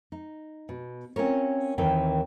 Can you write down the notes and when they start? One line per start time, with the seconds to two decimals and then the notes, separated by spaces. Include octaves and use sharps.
0.12 D#4
0.69 B2
1.16 C4 C#4 F4 A#4 C#5
1.78 D#2 D#3 E3 C4 G5